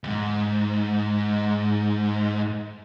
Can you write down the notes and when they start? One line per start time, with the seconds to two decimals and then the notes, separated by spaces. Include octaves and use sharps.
0.04 E2 G#2